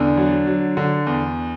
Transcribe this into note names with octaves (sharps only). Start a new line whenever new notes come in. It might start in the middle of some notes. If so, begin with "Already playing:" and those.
Already playing: E2 D3 D4
F#3
F#3
D3
E2